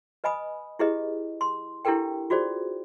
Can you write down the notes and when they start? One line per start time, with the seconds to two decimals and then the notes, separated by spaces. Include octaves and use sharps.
0.24 B4 D#5 G#5 B5 D#6
0.79 E4 G4 G#4 B4 D#5
1.41 C6
1.85 D4 E4 G4 A4 A#4 G5
2.30 F4 F#4 G#4 C5 D5